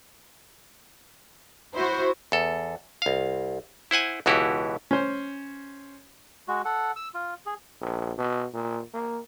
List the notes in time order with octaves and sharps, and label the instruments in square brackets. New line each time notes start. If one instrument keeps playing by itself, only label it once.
[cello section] E4 F#4 [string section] C5
[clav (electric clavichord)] E2 A4
C2 F5
E4 C5 F#5 G#5
C#2 B2 E3 E4 F#4 G4
[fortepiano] C#4 C5
[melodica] G#3 F#4
A4 F#5
E6
F4
G#4
[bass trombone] A#1
B2
A#2
A#3